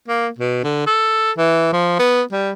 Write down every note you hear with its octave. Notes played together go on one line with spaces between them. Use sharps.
A#3
B2
D3
A4
E3
F3
B3
G3